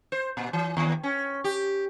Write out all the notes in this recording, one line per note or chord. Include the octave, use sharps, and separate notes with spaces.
C5
A#2
E3
D#2
C#4
G4